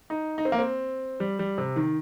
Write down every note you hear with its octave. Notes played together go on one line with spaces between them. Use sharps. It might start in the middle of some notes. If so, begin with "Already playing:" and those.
D#4
D#4
C4
A#3
C4
G3
G3
C3
D#3